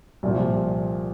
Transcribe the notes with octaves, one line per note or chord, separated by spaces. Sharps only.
C2 A#2 F3